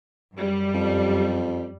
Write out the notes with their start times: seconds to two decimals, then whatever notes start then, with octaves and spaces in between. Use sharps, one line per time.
0.34 F#2 G3
0.74 F2